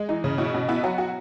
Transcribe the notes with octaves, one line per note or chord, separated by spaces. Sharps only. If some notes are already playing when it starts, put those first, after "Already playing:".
Already playing: G#3
E3 D#4
C#3
B2 E4
B2
B3 E4
F#3 F#4
F#4